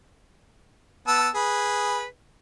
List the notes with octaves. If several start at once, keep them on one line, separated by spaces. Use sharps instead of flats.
B3 A5 E6
G#4 B4